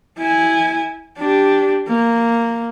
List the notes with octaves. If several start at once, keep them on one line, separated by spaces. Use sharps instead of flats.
E4 G#5
D4 G4
A#3